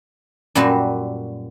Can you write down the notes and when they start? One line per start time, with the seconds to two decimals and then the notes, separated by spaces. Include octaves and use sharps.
0.55 F#2 A#2 G3 F#4 B4 A5